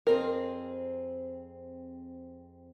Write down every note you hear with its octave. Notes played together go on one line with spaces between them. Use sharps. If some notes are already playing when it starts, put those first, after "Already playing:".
F2 C4 G#4 A#4